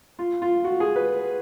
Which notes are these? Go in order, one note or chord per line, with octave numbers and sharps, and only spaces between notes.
F4
F4
F#4
G#4
B4